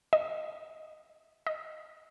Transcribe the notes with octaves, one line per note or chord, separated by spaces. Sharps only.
D#5
D#5